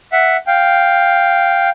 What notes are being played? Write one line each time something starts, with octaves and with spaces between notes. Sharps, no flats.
E5 F#5
F5 G5